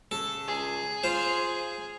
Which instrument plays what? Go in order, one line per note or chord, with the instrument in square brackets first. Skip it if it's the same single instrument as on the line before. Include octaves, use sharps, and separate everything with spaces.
[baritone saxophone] C#3 [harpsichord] A4
[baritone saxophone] C#2 [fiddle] G#4
[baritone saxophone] F4 [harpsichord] C5